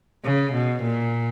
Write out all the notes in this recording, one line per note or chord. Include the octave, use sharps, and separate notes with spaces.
C#3
B2
A#2